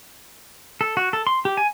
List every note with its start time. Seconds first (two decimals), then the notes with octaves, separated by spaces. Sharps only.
0.81 A4
0.97 F#4
1.13 A4
1.27 C6
1.45 G4
1.57 G#5